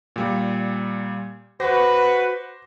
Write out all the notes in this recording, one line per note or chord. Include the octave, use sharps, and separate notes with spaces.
A#2 G3
F#4 B4 C5 D6 A#6